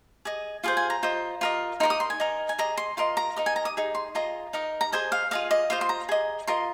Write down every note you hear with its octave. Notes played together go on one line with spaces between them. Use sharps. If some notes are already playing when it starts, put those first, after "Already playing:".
G#4 D#5
F4 G#4 C5 F5
G#5
A#5
F4 C5 D#5
F4 A#4 D#5
D#4 A#4 D#5 C6
D#6
C6
G#5
D#4 A#4 D#5
G#5
G#4 D#5 A#5
C6
F4 A#4 D#5 C6
A#5
D#4 A#4 D#5
G#5
A#5
D#6
D#4 G#4
C6
F4 G#4 D#5 A#5
D#4 A#4 D#5
A#5
G#4 C5 D#5 G#5
F5
F4 G#4 D#5 F5
D#5
F4 C5 D#5 F5
C6
A#5
G#4 D#5
F4 A#4 D#5 C6